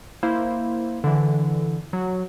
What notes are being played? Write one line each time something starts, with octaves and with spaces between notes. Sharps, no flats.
A#3 E4 C5
D3 E3
F#3